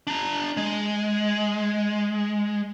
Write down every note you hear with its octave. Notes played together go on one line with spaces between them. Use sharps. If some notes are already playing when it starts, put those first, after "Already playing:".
D4 A#5
G#3